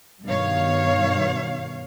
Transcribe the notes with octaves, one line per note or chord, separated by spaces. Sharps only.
G2 B2 D#3 C#5 F5